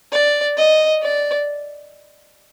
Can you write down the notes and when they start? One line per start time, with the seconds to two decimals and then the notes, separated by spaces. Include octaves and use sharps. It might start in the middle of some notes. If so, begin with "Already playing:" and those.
0.12 D5
0.57 D#5
1.02 D5